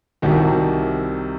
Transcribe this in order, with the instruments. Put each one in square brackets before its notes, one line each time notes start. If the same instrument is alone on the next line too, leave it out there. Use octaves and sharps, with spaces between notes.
[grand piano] C2 C3 D#3 F#4